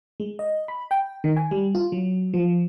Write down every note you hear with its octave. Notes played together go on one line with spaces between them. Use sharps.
G#3
D#5
B5
G5
D#3
G#5
G3
F4
F#3
F3